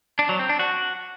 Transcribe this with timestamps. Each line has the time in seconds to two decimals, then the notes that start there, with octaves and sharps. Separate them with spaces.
0.19 D4
0.29 F#3
0.39 C4
0.49 D4
0.59 F#4